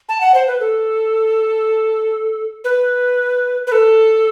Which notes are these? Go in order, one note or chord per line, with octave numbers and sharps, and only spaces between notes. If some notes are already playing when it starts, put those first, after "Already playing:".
A5
F#5
C5
B4
A4
B4
B4
A4